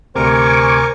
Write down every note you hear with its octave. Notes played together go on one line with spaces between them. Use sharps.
D2 C3 A#4 C5 G#5 C#6 D6